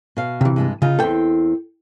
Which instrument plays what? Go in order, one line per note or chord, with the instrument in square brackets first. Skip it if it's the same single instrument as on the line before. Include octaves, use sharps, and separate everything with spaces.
[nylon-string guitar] B2 F5
[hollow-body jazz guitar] C3 E3
[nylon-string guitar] G2 G#3 A5
[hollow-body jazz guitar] C#3 [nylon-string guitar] D#4 F4
[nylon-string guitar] E2 C4 [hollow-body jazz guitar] A4 G5